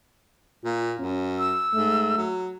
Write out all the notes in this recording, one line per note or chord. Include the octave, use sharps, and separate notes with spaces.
A#2 F4
F#2 C#4
E6
G#2 A3
F#3